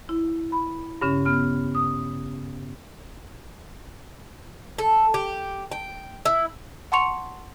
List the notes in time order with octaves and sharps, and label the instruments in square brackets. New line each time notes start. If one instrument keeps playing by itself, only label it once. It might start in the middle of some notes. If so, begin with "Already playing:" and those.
[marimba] E4
B5
G2 C#3 C#4
B3 F6
D#6
[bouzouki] A4
G4
G5
E4
[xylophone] F#5 A5 C6 C#6 C#7 F7